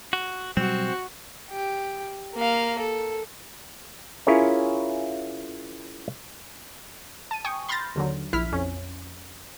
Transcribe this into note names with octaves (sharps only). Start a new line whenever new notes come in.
F#4
B2 F#3 G3 C4 F#4
G4
A#3 F5
A4
C#4 E4 F4 G#4 A#4 C#5
A5 D#7
G5 G#5 C#6 D#6
B5 C6 F6 G6 A6 A#6
D#2 D3 F#3
A#1 E4 F6 B6
F2 C#4